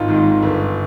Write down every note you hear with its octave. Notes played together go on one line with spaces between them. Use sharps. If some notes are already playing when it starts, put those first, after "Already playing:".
Already playing: G#1 D#4 F4
G#2 D#3
G1